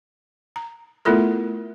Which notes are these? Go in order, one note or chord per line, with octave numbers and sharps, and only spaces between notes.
A#5
A3 B3 E4 F4 A4 A#4